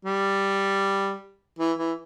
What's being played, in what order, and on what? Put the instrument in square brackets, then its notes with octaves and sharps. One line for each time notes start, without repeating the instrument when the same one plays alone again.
[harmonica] G3
E3
E3